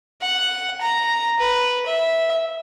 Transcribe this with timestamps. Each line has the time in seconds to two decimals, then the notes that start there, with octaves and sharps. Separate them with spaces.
0.21 F#5
0.81 A#5
1.39 B4
1.86 E5